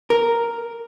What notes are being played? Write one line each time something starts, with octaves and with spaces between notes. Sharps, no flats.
A#4